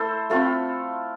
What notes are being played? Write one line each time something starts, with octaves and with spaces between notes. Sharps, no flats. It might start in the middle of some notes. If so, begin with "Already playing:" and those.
Already playing: A3 E4 A4 C5
A3 C4 E4 F4 A4